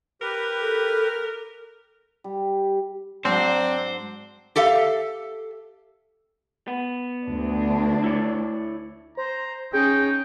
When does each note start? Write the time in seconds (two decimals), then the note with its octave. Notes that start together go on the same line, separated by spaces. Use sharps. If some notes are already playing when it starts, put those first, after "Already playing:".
0.21 G4 A#4 B4
0.60 A4
2.24 G3
3.25 G#2 F#3 C4 D4 C5 A#5
4.56 G4 A4 E5 F5
6.68 B3
7.25 D2 D4
8.04 E4 C#5 D5
9.17 C5 A#5
9.73 C#4 D#4 G#4 G5